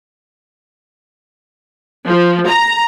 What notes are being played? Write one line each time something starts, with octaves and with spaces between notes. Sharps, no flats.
F3
A#5